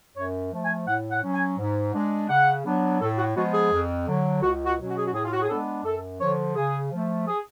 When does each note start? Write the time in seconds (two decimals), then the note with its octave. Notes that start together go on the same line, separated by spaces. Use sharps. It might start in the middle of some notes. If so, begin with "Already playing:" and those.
0.16 F#2 C#5
0.52 F3 A3
0.64 G#5
0.88 A2 F#5
1.11 F#5
1.23 F#3 C#4
1.34 G#5
1.58 G#2
1.94 G#3 D4
2.29 C#3 F#5
2.65 F#3 B3 D4
3.01 A2 A4
3.18 F#4
3.36 F3 G#3 B3 F#4
3.53 G#4
3.71 F2
4.07 D3 F#3
4.43 C#2 F#4
4.66 F#4
4.78 B2 F#3 C#4
4.90 F#4
4.98 G#4
5.06 F#4
5.13 A2 G#4
5.25 F4
5.33 F#4
5.42 G#4
5.49 G#3 B3 D4 A4
5.84 F#2 A4
6.20 D3 F3 C#5
6.55 C#3 G#4
6.92 F3 A3
7.27 G#4